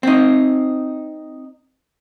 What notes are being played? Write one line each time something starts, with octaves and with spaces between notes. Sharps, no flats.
C4 D#4